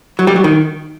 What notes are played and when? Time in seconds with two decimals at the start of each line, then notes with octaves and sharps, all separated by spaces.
0.19 F#3
0.27 G3
0.36 F#3
0.44 D#3